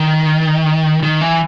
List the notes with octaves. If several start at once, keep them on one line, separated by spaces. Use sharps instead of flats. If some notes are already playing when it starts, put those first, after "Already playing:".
Already playing: D#3
D#3
E3